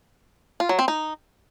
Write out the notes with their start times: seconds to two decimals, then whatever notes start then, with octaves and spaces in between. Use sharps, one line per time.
0.60 F4
0.69 F#3
0.79 C4
0.88 D#4